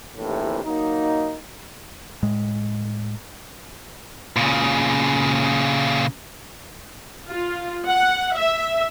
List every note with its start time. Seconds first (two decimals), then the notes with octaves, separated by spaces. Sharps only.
0.17 A#1 D#2 A2 C3 E3
0.64 F#3 A#3 D#4
2.23 A2 G#3
4.36 A#2 C#3
7.30 F4
7.88 F#5
8.36 E5